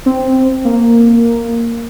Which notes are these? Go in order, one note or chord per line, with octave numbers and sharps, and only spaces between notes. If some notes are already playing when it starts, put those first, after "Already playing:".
C4
A#3